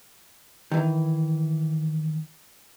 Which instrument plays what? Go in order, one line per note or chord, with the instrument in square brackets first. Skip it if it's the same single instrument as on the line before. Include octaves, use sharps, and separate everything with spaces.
[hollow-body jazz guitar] D#3 E3